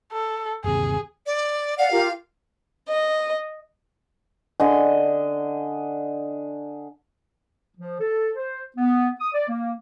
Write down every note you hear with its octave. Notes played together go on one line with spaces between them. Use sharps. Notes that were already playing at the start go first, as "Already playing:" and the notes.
A4
G1 D#2 C3 G#4
D5
D5 F5 F#5
F4 G4 A#4
D#5
D3 D#5 G#5
F3
A4
C5
B3
D#6
D5
A#3